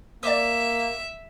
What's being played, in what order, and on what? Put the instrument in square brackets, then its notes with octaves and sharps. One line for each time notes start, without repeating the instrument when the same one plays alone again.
[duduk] A#3 [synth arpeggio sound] D5 D6 [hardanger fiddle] E5